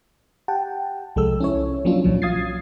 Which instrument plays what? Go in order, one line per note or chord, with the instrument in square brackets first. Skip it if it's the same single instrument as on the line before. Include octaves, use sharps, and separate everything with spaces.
[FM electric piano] G4 F#5 G5 A5
C2 F3 G#3 A4 E6
C#4 E4 C#5
F3 F#3 A#3 C#4 D4 F4
C2 A#2 F3 F#3
F5 D#6 G#6 A6 C7